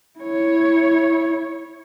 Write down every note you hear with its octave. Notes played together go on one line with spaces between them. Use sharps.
E4 C#5